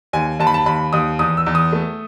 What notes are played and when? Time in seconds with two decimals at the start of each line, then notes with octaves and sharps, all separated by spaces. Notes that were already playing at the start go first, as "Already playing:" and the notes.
0.13 D#2 G#5
0.39 D#2 A5
0.47 B5
0.54 A5
0.66 D#2 B5
0.93 D#2 D#6
1.19 E2 D#6
1.37 E6
1.46 E2
1.55 D#6
1.73 A3